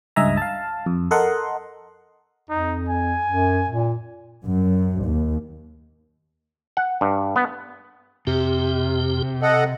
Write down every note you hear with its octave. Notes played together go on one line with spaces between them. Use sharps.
C#2 G2 D#5 E5 G#5 A#5
F5 A5
F2
A4 A#4 D#5 F#5 C6
F2 D#4
G#5
F#2
A#2
F#2
D#2
F#5
G2
B3
F2 C3 G4
A4 D#5 F#5